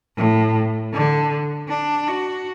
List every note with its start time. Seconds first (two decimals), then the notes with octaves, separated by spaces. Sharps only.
0.17 A2
0.93 D3
1.68 D4
2.07 F#4